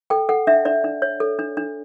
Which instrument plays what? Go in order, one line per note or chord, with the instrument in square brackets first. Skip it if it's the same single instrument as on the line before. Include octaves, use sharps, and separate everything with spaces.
[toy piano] A4 G5
A4 F#5
D4 E5
D4 D5
D4
C#5
A4
D4
D4